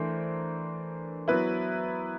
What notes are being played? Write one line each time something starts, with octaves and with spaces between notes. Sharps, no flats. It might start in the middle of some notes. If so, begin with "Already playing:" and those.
Already playing: E3 A3 D4 A#4 C5
F#3 B3 E4 B4